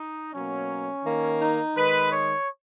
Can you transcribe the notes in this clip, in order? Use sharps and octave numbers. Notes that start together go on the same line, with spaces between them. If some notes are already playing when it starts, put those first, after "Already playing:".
Already playing: D#4
B2 F#3 A#3 C#4
D#3 A#3
D#4
D#3 G#3 B4
C#5